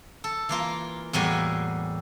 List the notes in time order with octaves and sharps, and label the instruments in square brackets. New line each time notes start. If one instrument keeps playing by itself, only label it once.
[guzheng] A4
E3 A#3 F4 A#4
E2 A2 G3 A#3 F#4 G#5